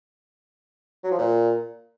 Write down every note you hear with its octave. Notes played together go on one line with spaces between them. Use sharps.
F#3
F3
A#2